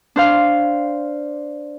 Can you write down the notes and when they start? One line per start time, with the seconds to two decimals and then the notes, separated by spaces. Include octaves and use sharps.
0.16 D4 C5 F5